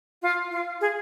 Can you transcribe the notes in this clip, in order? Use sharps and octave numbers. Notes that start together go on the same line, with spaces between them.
F4
F4
G#4